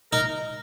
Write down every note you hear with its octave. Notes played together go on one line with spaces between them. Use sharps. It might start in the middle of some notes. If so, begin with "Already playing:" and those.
D#4 A#4